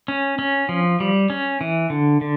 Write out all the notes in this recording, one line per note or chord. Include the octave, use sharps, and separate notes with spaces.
C#4
C#4
F3
G3
C#4
E3
D3
D3